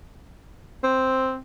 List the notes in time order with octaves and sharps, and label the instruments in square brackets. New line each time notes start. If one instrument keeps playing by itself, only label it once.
[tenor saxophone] C4